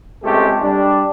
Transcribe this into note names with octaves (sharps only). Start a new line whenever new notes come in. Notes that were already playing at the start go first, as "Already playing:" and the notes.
C#2 C3 G#3 A3 G4 A4
G3 D4